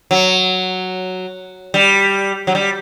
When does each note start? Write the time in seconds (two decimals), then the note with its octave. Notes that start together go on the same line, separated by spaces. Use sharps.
0.11 F#3
1.74 G3
2.47 F#3
2.55 G3